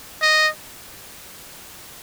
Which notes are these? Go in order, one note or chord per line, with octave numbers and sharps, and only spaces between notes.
D#5